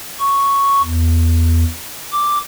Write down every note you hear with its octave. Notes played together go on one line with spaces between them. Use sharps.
C#6
E2
D6